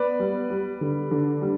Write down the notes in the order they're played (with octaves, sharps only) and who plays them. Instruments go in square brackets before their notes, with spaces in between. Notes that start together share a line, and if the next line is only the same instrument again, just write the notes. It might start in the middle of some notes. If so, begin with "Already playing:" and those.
Already playing: [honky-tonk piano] B3 [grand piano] B4 D5
[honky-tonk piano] G3
G3
D3
D3
G3